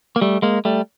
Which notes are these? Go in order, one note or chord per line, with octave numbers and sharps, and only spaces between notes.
A#3
G3 A3
G#3 A#3
G3 A3